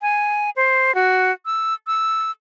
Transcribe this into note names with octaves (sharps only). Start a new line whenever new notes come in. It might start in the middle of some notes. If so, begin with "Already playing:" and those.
G#5
C5
F#4
E6
E6